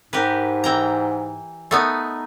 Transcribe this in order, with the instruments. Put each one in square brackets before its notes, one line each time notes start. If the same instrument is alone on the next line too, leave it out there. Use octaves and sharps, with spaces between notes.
[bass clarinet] G#2 [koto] G4 A#4 B4
[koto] E3 G5 A#5
A3 B3 D#4